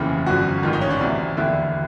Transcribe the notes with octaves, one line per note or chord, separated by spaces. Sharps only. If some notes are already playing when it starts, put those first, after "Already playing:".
Already playing: F1 D#2 C#3 E3 F4
G1 F#2 D3 F3 F#4
A1 G#2 D#3 F4
D#4
C#4
D4
D2 C3 E3
E1 D#2 D3 E4